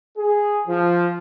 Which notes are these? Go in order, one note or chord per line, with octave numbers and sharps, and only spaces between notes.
G#4
F3